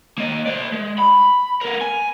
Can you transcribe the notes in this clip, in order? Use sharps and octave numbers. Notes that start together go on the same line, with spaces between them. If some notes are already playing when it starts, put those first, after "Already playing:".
A#3 D#5
C5 D5
G#3
B5
B3 A#4
G#5